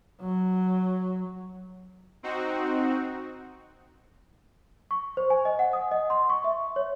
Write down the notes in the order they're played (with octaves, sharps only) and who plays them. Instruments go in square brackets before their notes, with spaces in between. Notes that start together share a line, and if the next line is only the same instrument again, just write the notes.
[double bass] F#3
[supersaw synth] C4 D#4 F#4
[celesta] C#6
C5
G#5
D#5
F#5
D#6
D#5
C6
C#6
E5
C#5